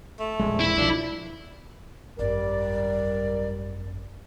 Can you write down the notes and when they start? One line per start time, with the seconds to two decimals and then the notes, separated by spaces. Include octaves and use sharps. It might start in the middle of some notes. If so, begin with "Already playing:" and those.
0.20 A3
0.39 E1 A#1 G#3
0.60 E4
0.77 B1 F3 D4
2.19 G#1 F#2 G3 A#4 D5